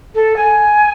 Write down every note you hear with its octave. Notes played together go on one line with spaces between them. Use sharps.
A4
G#5